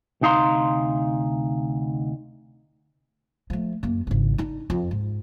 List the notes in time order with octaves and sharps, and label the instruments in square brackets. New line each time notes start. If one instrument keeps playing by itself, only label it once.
[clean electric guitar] D2 C3 D#4 F5 A#5 C6
[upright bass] F3 A3
F#2 A#3
G#1 C#3
D4 D#4
F2
G#2